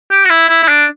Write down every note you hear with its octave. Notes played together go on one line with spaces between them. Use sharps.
G4
F#4
E4
E4
E4
D4